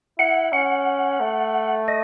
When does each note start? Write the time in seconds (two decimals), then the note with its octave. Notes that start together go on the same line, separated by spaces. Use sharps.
0.19 E4 F#5
0.52 C#4 F#5
1.20 A3
1.88 D#5